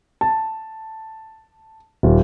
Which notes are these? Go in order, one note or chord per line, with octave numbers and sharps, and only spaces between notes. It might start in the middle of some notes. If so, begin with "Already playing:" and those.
A5
D#1